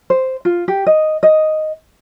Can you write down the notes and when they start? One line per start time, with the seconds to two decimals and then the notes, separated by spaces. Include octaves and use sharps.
0.10 C5
0.45 F4
0.68 G4
0.87 D#5
1.23 D#5